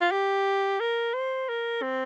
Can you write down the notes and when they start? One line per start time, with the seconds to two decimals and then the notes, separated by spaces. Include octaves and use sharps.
0.01 F4
0.11 G4
0.80 A#4
1.14 C5
1.49 A#4
1.82 C4